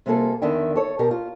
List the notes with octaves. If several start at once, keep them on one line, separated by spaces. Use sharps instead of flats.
C3 G3 A#3 F4 G#4 A4
E2 D3 D#3 E4 E5 G5
A4 C#5
B2 G4 A#4
F4